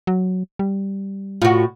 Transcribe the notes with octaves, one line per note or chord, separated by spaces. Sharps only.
F#3
G3
A2 F4 F#4